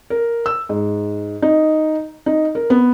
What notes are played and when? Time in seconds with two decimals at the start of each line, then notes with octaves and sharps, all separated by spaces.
0.10 A#4
0.46 E6
0.69 G#2
1.42 D#4
2.26 D#4
2.55 A#4
2.70 B3